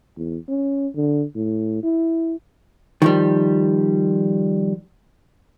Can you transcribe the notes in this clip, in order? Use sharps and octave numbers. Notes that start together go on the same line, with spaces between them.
E2
C#4
D3
A2
E4
D#3 F3 G3